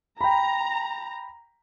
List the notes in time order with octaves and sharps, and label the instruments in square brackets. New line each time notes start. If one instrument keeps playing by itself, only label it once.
[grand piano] G5 B5 [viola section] A#5